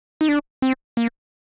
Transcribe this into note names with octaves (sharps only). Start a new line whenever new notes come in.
D#4
D4
C4
A#3